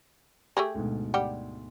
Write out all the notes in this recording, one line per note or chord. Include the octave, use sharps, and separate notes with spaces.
A3 G4 G#4
D2 G#2 B2
G3 G4 F#5